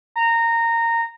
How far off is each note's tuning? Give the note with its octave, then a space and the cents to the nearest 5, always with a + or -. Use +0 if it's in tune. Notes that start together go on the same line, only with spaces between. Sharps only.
A#5 -15